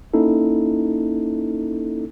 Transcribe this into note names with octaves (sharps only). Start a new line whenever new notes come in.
A#3 C#4 D#4 E4 A4